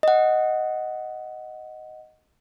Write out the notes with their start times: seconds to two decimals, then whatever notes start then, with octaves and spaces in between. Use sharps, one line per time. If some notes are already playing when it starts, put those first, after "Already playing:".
0.03 D#5 F#5